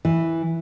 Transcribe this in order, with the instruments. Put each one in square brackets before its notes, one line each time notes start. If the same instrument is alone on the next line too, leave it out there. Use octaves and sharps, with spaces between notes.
[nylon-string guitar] E3